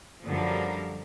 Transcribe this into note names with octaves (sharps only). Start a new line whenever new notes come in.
F#2 D3 F3 G3 A4 A#4